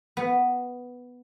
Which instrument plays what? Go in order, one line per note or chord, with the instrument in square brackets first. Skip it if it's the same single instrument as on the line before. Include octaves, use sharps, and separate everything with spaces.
[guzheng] B3